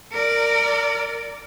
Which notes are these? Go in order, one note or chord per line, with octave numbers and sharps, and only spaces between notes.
A#4 D5